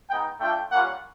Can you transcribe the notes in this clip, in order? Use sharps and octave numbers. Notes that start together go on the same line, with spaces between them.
G#3 B3 D#4 G5
A3 D4 F4 G5
G3 A#3 C#4 F4 F#5